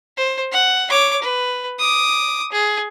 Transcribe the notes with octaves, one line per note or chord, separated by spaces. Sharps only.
C5
F#5
C#5 D6
B4
D6 D#6
G#4